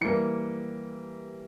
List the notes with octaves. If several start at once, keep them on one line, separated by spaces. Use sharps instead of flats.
E3 G3 A#3 C#7